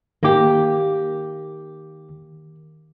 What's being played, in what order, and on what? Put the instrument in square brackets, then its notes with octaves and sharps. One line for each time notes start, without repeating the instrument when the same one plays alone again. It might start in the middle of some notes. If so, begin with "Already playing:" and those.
[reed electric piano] D#3 D6 [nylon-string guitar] A#3 G4